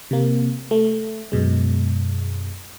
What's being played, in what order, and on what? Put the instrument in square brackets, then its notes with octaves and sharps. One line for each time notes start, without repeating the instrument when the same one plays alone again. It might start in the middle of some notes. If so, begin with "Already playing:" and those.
[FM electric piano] C3 A#3
A3
F#2 B2 G#3